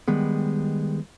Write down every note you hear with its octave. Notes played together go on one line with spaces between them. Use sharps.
D#3 G3 G#3 B3